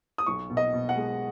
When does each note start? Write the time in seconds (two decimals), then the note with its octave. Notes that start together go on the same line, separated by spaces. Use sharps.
0.18 D#6
0.26 B1 C#6
0.50 B2
0.57 D#5
0.73 B2
0.89 F#5
0.96 G#3